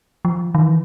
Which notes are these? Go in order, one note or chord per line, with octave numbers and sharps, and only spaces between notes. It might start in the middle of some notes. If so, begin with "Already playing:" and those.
F3
D#3
E3